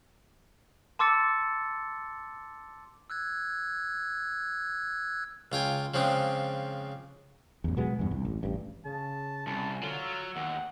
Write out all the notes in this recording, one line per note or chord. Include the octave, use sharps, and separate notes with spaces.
A5 C6 D6 E6 A6 C#7
E6 F#6 G#6
C#2 F4 G5 G#5
C#3 F3 G#3 C4 D4
A1 E2
B2 F#3 G#3 B3
E2 G2
C2
A1
A1 G2
C#3 A5
C2 C#4 A5
D3 F#3 F4
E6
D#2 F#5